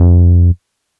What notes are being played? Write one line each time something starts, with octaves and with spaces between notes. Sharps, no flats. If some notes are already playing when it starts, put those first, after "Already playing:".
Already playing: F2